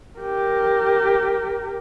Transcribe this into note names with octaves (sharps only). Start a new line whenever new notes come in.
G4 A#4